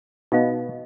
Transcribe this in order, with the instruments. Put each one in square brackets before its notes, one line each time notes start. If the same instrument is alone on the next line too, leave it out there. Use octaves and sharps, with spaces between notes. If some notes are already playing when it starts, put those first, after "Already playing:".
[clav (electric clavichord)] B2 B3 [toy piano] D#4 D#5 F5